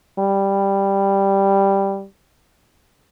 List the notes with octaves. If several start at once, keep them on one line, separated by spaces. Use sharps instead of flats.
G3